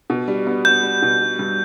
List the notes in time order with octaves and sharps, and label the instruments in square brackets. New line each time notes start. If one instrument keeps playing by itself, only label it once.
[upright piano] B2
G3
B3
[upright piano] B3 [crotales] G6
[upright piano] G3
B2
G3
G2